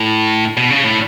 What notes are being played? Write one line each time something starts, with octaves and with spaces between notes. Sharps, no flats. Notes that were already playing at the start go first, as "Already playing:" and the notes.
Already playing: A2
B2
C#3
A2